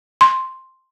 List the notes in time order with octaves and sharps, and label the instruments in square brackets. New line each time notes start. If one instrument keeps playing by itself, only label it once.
[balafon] C6